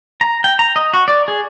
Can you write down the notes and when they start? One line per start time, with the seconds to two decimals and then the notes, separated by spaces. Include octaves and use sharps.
0.21 A#5
0.44 G5
0.59 A#5
0.76 D#5
0.93 F#4
1.08 D5
1.28 G#4